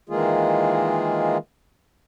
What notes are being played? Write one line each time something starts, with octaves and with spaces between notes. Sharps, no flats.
D#3 E3 G#3 A#3 F4 G#4